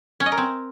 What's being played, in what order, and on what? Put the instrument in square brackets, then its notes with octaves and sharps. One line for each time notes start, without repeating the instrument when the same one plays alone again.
[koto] C#4
D#5
A#4
C4